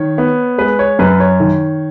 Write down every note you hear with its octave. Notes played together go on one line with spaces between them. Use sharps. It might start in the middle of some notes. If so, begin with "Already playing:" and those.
Already playing: D#3 C#5
B3
G#3 B4
C#5
F#2 B4
C#5
D#3